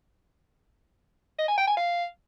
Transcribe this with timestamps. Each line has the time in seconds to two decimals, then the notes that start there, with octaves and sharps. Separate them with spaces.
1.39 D#5
1.48 G#5
1.58 G5
1.67 G#5
1.77 F5